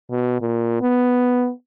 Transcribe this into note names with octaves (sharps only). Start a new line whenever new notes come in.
B2
A#2
B3